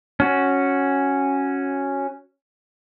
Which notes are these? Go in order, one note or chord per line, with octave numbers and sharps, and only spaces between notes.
C#4 F#4